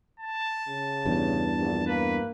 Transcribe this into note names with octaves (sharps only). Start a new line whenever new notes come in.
A5
C#3
E2 G2
A#1
A#3 B4